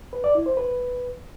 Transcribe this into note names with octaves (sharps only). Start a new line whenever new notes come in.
B4
D5
E4
C5
B4